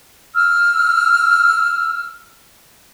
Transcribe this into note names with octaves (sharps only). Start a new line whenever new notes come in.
E6 F6